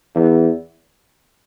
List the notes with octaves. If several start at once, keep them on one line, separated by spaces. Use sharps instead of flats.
E2